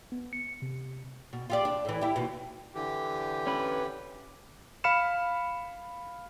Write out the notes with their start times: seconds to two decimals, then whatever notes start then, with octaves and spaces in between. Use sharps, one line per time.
0.12 B3
0.33 C#7
0.62 C3
1.33 B2
1.50 F4 G4 D5
1.65 D4
1.85 A2 E3
2.01 E4 G4
2.16 D#2 B2
2.75 D3 E3 G4
3.47 C#4 B4
4.84 F5 B5 F6 C#7 E7